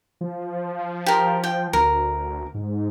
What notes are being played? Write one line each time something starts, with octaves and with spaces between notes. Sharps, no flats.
F3
G4 A#4
G5
D2 A#4
G#2